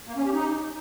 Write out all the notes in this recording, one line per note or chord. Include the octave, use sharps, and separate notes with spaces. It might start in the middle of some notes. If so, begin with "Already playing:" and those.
A#3
C#4
G4
D#4